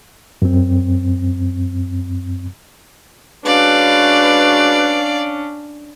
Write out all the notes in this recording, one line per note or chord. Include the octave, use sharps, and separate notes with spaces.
F#2 C4
G#3 C#4 D4 F#4 B4 D5 F5